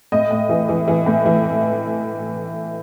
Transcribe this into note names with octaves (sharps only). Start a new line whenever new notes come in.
A2 D#5
A2
E3
E3
E3
A2
E3